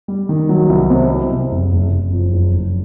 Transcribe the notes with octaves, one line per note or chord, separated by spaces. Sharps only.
G3
D#3
F#3
C2
C3
C3
C3
F#1
F#1
F#1
F2
F#1
F#1